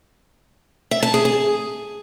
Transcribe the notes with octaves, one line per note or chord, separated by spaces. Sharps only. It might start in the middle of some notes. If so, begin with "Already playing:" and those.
E5
A5
G#4
G#4